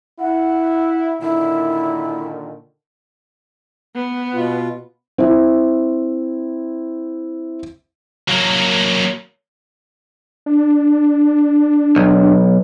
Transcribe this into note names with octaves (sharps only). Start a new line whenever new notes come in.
E4 F#5
A#2 D3 D#3 E4
B3
B2 F4
C4 E4
F#3 A#3
D4
B1